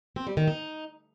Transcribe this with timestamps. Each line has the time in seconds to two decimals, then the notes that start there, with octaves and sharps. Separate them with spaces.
0.16 C4
0.27 G3
0.37 D#3
0.47 D#4